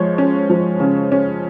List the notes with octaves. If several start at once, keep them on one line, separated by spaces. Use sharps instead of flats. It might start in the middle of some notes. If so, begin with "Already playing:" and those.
Already playing: F3 G#3 C#5
C#4
F3
C#3
C#4